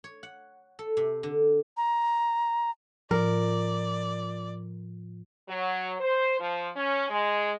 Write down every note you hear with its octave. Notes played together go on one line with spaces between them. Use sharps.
C#5
F#5
A4
C3
D3
A#5
A2 F3 A#4 D5
F#3
C5
F3
C#4
G#3